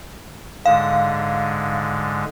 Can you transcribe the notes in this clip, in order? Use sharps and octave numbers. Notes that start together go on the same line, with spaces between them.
G#2 D3 G#3 F5